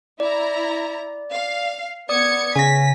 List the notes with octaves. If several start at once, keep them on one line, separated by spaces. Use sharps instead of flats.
E4 D5 A#5
F5
B3 D5 D#6 G#6 C#7
C#3 G#5 A#6 B6